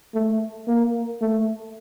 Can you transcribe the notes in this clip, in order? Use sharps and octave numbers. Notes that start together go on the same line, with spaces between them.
A3
A#3
A3